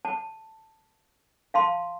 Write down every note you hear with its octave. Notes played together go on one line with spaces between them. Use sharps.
A5
F5 A5 C6